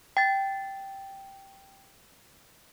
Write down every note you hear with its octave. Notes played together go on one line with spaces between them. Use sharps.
G5 A6